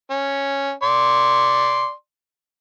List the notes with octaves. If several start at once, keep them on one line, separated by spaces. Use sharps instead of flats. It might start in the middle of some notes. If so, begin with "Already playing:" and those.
C#4
D5 C6